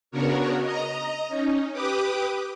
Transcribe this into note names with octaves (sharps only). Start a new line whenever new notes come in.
C#3 B3 D4 F#4 A#4 C#5
D#5 A#5
C#4 D#4
G4 B4 D6 D#6